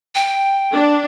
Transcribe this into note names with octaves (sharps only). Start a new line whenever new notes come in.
G5
D4